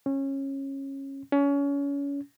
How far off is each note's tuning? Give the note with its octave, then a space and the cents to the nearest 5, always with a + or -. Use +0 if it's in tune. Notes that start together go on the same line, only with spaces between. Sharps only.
C#4 -20
C#4 +30